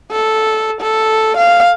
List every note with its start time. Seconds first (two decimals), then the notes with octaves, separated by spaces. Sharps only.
0.11 A4
0.81 A4
1.38 F5